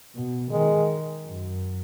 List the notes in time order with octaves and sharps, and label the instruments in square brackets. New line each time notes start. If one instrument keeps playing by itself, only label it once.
[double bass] B2
[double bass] D#3 [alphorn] G#3
[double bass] F#2